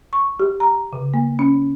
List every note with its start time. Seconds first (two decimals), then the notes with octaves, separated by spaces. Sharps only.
0.13 C#6
0.40 G4
0.60 A#5
0.93 C#3
1.14 A#3
1.39 C#4